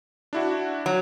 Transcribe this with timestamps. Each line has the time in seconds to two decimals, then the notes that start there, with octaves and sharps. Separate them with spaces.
0.33 D4 E4 F#4
0.86 F#3